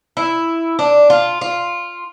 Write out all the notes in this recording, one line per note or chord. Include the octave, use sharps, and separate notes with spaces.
E4
D4
F4
F4